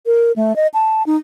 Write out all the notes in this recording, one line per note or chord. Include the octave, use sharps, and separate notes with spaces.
A#4
A3
D#5
A5
D#4